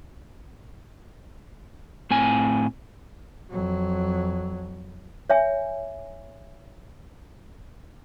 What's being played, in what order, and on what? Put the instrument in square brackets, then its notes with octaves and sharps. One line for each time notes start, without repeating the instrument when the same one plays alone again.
[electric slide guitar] A2 C4 G#5
[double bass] F2 F#3
[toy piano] C#5 E5 G#5